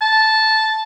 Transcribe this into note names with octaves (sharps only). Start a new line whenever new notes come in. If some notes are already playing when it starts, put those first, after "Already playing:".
A5